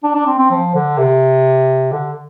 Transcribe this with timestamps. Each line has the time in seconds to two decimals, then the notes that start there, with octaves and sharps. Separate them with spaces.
0.04 D4
0.15 D4
0.27 C4
0.39 C4
0.51 F3
0.75 D3
0.98 C3
1.92 D3